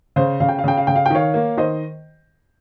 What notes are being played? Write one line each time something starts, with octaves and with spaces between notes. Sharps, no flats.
C#3 C5
C#3 F5
G5
F5
C#3 G5
F5
C#3 G5
F5
G5
D#3 C#5 F5
A#3
D#3 C5 D#5